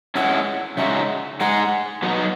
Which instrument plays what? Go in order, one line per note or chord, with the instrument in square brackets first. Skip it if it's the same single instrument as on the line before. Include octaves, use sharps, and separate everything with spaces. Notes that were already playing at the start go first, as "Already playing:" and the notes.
[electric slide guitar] G#3 C#4 E4 [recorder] F#5
[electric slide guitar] C#3 G#3 D#4 F#4 [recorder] E5
[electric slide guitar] G#3 D#4 G#4 [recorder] F#5
[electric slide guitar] F#3 B3 D#4